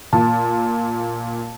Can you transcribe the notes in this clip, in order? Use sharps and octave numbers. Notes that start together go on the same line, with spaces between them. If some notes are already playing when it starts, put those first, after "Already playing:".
A#2 A5